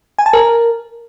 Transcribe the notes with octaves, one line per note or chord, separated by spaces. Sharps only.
G#5
A5
A#4